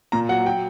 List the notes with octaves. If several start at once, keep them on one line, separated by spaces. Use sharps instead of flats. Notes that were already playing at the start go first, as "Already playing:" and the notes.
A#2 A#5
F#3 F#5
F#3 G5